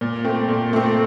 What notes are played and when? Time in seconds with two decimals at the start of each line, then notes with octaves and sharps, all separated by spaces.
0.01 A#2
0.24 A3 C4
0.48 A#2
0.73 A3 C4